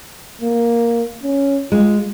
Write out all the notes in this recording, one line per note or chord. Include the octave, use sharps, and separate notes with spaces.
A#3
C#4
G#3 F4